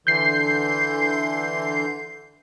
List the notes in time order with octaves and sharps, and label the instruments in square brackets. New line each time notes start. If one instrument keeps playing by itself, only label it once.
[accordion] D3 E3 C6 [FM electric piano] G6 C7